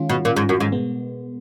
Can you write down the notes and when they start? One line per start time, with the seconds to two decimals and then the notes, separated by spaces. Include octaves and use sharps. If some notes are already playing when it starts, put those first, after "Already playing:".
Already playing: D#3 G#3 C#4 F4
0.09 B2
0.25 A#2
0.36 G#2
0.49 F#2
0.60 G#2
0.72 B2 G#3 B3